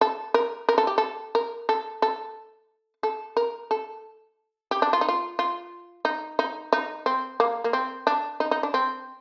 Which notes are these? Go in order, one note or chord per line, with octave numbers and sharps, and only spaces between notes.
A4
A#4
A#4
A4
G4
A4
A#4
A4
A4
A4
A#4
A4
G4
D4
F4
D#4
F4
F4
D#4
D#4
D#4
C4
A#3
A#3
C4
D4
D#4
D#4
D4
C4